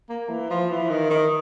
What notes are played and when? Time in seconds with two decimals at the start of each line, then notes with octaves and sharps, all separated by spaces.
0.09 A#3
0.29 E3
0.50 F3
0.70 E3
0.89 D#3
1.10 D#3